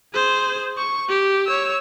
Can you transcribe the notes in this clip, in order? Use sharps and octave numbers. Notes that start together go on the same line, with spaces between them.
G#4 C5
C#6
G4
C#5 E6